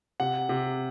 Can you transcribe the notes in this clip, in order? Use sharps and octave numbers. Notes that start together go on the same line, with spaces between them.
C3 F#5
C3